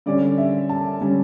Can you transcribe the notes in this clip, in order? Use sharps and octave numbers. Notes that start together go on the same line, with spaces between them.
D3 G3 C#4 D5
E5
A5
D3 G3 C#4